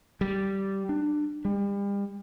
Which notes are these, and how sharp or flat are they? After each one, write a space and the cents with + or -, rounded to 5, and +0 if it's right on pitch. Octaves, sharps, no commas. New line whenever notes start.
G3 -10
D4 +25
G3 +40